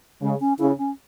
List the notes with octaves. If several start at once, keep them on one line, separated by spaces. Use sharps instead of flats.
C#3 G#3
C#4
C#3 E4
C#4